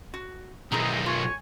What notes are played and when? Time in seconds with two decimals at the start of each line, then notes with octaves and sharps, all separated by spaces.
0.14 F#4
0.72 B1 F#2 C4 D#4 E4 G#4 A#5
1.06 F4 C#5 G#5 C#6